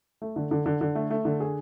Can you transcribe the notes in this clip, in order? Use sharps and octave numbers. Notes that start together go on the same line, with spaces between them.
A3
D3
D3
D3
D3
A3
A3
D3
G#4